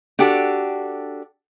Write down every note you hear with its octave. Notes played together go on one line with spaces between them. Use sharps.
D4 F#4 G4 A4